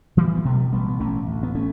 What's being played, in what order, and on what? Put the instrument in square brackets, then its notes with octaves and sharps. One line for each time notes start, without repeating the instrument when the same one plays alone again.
[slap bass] B2 E3 G3
B3
B2 F#3 A3
A1 G3 B3
B3
A1 A3 C#4
D2
B3
A3 C#4